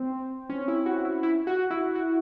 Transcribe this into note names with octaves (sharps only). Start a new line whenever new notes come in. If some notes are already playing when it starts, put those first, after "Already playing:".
Already playing: C4
C#4
E4
F#4
E4
E4
F#4
E4
F#4